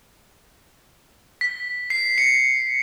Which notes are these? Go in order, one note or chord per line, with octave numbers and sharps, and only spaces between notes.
B6
C7
C#7